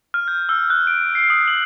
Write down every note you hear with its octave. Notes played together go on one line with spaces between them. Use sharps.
F6
G6
E6
F#6
D7
C7
D#6
F#7